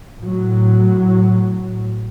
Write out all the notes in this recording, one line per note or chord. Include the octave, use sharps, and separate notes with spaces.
A2 F#3